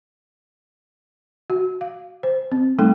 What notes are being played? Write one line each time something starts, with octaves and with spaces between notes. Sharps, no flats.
F#4
F5
C5
C4
G3 A3 D#4 A4 G5